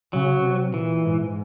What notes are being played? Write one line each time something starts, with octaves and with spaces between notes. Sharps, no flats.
C#3 F#3
C3
A#2 E3
G#2